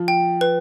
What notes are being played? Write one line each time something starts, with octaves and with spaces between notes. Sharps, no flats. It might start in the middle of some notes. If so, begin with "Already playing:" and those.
Already playing: F3
G5
B4